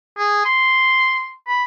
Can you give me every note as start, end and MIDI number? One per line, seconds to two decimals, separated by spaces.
0.18 0.45 68
0.45 1.32 84
1.48 1.64 83